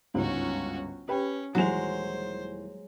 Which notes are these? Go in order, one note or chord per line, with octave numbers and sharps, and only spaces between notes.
G1 C#2 G#2 C#4 F#4
C#4 G4 B4 G5
D#1 E3 F#3 G#3 C5 F7